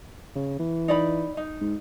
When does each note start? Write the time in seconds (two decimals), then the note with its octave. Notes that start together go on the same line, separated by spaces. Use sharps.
0.36 C#3
0.59 E3
0.88 D#4 D5 B5
1.37 D#4
1.61 G#2